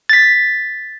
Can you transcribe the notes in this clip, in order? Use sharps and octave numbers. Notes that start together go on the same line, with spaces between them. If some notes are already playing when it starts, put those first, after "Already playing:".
A6 B6